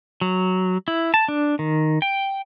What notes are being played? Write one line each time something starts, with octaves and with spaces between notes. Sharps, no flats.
F#3
E4
A5
D4
D#3
G5